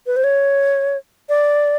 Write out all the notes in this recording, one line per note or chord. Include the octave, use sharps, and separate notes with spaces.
B4
C5
C#5
D5